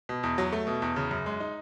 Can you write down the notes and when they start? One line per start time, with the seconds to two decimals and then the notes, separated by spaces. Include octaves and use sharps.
0.09 B2
0.23 E2
0.38 F#3
0.52 A3
0.67 B2
0.82 E2
0.96 C#3
1.11 F#2
1.26 G#3
1.40 D#4